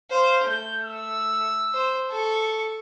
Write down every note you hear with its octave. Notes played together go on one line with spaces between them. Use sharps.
C5 F5
A3 G6
E6
C5
A4 C#6